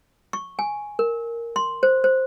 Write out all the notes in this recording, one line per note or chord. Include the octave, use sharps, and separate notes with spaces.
C#6
G#5
A#4
C6
C5
C5